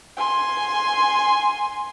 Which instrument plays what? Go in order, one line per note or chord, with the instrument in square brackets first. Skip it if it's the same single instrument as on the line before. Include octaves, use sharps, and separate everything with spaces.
[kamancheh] G#5 C6